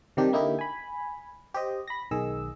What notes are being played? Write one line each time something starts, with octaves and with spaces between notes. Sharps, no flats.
C3 D#3 G3 D4 G4
D3 A#3 D#4 E4 G4
G#5 B5
G4 C5 D#5
B5 A#6
B1 D#3 G#4 D#5 E6